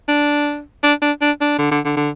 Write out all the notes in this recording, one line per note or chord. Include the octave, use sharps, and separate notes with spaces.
D4
D4
D4
D4
D4
D3
D3
D3
D3